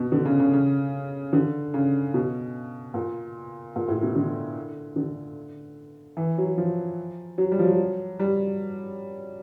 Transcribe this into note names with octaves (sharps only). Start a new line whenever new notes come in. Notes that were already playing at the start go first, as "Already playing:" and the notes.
Already playing: B2
D3
C#3
C#3
C#3
D3
C#3
B2
A#2
A#2
A2
B2
D3
D3
E3
F#3
F3
F#3
G3
F3
F#3
G3